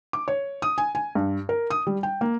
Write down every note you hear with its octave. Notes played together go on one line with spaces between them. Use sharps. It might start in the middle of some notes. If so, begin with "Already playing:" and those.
D6
C#5
D#6
G#5
G#5
G2
A#4
D#6
G3
G5
A#3